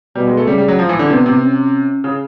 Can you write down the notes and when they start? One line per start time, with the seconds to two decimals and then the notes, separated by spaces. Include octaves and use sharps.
0.15 B2 G3
0.27 G#3
0.37 A3
0.47 C#3 G3
0.58 G3
0.68 F#3
0.79 F3
0.89 E3
0.99 D3
1.10 C3 B3
1.26 C3
1.42 C#4
2.04 C#3